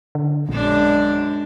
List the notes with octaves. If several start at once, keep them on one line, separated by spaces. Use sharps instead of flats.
D3
A#1 F#2 G#3 D4